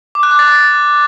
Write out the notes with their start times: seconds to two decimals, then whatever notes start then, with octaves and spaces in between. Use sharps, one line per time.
0.15 D6
0.23 F#6
0.31 D6
0.39 A6